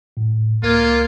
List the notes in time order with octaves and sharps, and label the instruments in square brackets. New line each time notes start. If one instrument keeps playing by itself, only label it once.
[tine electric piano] A2
[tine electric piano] C#2 A#4 G#6 [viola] A#3 [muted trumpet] F4